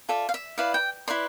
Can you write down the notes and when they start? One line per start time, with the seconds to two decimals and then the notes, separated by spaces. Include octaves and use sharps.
0.09 F4 A4 D5 E5
0.29 F5
0.34 E5
0.58 E4 B4 D5 F5
0.74 G5
1.08 E4 B4 D5 C6